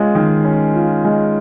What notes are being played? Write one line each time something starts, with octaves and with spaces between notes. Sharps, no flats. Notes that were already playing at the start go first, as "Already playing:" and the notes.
Already playing: G#3 C#4 F4
D#3
C#4
F4
G#3